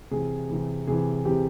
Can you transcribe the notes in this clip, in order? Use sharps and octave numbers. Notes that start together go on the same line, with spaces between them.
C3 E3 G#4
C3 E3
C3 E3 G#4
C3 E3 G4